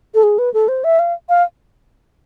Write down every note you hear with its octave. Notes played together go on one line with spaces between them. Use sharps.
A4
G#4
B4
A4
C5
E5
F5
F5